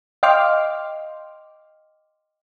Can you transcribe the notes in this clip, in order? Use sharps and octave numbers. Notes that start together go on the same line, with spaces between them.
D#5 F5 G5 C6 D6 F6